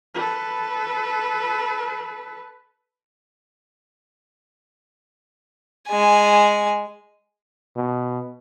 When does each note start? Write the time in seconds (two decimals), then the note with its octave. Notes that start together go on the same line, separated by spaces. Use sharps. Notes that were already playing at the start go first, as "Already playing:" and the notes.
0.15 A4 B4
5.88 G#3 G#5
7.76 B2